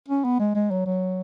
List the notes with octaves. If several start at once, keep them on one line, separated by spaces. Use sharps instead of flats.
C#4
B3
G#3
G#3
F#3
F#3